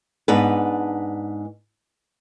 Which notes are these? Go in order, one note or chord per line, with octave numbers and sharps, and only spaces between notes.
G#2 B3 D4 B4